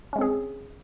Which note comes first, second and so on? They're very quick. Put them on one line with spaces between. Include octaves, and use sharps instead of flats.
C#4 G#3 C4 G#4